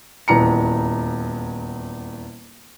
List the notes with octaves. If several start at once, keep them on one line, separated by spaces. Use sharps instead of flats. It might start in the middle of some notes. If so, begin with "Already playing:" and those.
D#1 E2 A#5 C#7